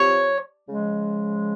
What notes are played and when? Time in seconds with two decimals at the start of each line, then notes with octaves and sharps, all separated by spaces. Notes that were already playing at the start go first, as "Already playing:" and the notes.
Already playing: F3 C4 G4 C#5
0.68 C#3 F3 G#3